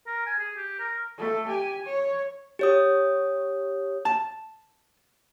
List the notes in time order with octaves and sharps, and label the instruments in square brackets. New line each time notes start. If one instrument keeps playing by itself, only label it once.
[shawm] A#4
G#5
G#4
G4
A#4
[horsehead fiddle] A3 A4
G4 G#5
C#5
[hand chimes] G4 C#5 D#6
[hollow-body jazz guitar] A5